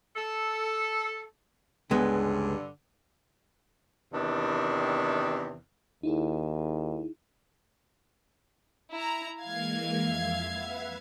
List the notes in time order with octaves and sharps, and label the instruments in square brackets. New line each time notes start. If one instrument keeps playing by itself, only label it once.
[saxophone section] A4
[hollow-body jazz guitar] C#2 G#3 B3 [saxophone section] G2 D3
[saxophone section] E2 C3 D#3 D4
[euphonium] D#2 [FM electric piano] D#4 E4 G#4
[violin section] E4 A#5
[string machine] E3 G#3 A#3 [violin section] F5 G#6
[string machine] F2 E5
B4 E5 F#5